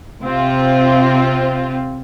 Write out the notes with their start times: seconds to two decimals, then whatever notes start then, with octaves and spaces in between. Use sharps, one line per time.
0.22 C3 C4 F4